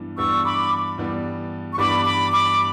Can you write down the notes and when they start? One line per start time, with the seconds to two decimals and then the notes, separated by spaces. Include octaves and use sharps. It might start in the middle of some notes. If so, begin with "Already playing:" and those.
Already playing: G2 E3 G3 B3 D4
0.17 G2 E3 G3 B3 D4 C#6 E6
0.44 B5 D6
0.98 G2 E3 G3 B3 D4
1.73 C#6
1.78 G2 E3 G3 B3 D4 B5 D6
2.05 B5 D6
2.32 B5 D6